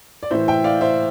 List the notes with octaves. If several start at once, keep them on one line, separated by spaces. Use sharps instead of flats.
D5
A2 E3 C5 E5
E5 G5
D5 F5
C5 E5